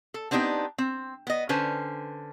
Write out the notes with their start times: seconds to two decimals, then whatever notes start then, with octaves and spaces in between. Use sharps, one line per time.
0.14 A4
0.31 B3 C4 D4 D#4 F#4 G4
0.78 C4
1.27 B3 D#5
1.49 D3 C#4 B4 C5